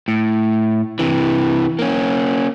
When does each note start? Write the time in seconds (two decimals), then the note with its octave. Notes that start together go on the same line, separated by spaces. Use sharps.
0.08 A2
0.99 C3 E3
1.79 A#3 C#4